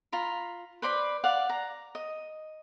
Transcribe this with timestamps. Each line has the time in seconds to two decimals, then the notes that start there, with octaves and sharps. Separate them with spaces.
0.12 F4 A#5 B5
0.82 B4 C5 D5 B5
1.24 D5 F5 F#5
1.49 A#5
1.95 D#5